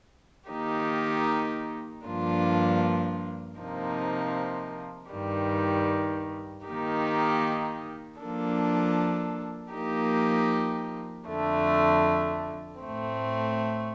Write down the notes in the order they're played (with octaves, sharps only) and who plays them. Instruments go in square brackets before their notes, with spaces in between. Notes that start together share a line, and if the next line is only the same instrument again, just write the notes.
[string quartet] D#3 A#3 D#4 G4
G2 F3 A#3 D4 F4
C3 F3 A#3 D#4
G2 D#3 G3
D#3 A#3 D#4 G4
F3 A#3 D4 A4
F3 A#3 D#4 G4
F2 D3 A3
A2 A3 C4